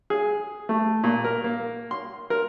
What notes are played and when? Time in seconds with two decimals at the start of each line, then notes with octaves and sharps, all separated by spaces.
0.10 G#4
0.69 A3
1.04 A#2
1.24 A#4
1.44 A#3
1.91 C6
2.30 A#4